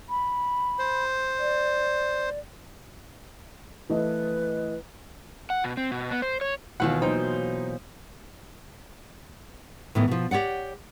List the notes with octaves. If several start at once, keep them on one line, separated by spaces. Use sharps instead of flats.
B5
C5
D5
E3 A3 B4 D#5
F#5
B2
C4
B2
B3
C5
C#5
D#2 B2 E3 F4 F#5
F#3 A#3 D#4 C5 G5
A2 D#3 E3 B3
B2 F3
G4 C#5 D5 F#5